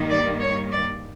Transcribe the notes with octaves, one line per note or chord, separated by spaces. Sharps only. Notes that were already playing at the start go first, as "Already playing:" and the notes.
Already playing: G2 D#3 G3 A#3
D5
C#5
D5